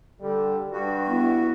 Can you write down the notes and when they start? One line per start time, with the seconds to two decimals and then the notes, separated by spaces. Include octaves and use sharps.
0.21 D3 G3
0.72 G2 F#4
1.07 B3 E4